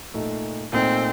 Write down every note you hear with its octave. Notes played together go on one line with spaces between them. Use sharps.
A#2 A3 D#4
A#2 A3 C4 D#4